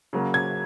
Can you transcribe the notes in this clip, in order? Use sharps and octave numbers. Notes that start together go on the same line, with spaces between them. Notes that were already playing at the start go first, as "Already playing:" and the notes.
C#3 F#3 A#3
G#6